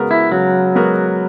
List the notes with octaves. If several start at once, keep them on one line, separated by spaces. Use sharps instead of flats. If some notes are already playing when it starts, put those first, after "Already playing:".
Already playing: C#3 G#3 B3 F#4 A#4
E4
C#3 F#3
G#3 B3 F#4 A#4